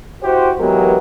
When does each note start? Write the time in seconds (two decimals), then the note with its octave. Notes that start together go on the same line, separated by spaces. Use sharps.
0.22 E4 F#4 G4 C5
0.59 E3 F#3 G#3 B3 G4 A#4